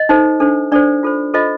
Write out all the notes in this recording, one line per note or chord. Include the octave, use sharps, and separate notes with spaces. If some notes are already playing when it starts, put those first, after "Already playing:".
Already playing: D#5
D#4 A4 C5
D4 A4 C5
D4 A4 C5 D5
F4 A4 C5
F4 A4 C5 D#5